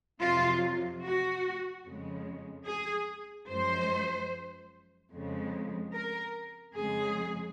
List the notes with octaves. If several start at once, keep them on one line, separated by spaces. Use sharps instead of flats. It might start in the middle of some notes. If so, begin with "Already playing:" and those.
F2 C3 F#3 F4
F#4
F2 C#3 G#3
G#4
F#2 F3 G#3 C5
F2 C#3 G#3
A#4
F2 C#3 G#3 G#4